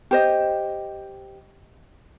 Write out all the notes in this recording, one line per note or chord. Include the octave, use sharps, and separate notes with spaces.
G4 C5 D#5